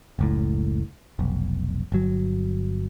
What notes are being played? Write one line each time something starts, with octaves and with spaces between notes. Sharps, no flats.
F#1 C#2 A2
F1 B1
G1 F#3